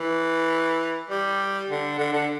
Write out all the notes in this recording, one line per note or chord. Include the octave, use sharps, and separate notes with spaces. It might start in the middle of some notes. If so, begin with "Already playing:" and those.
Already playing: E3
G3
D3
D3
D3